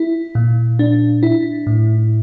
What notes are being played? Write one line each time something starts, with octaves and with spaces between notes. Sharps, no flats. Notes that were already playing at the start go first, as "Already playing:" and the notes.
Already playing: E4
A#2
D4
E4
A2